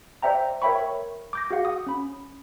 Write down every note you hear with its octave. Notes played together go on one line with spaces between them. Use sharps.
C5 D5 E5 G5 A#5
A#4 C#5 E5 G5 B5 C#6
D6 G6 A#6
F#4 G#4 F5 F#5
D#6
C#4 B5